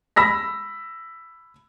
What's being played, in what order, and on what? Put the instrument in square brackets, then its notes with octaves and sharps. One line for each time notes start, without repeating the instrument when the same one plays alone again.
[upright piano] B5 E6 A#6 B6